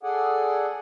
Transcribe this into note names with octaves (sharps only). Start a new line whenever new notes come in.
G#4 A4 D5 F#5 G#5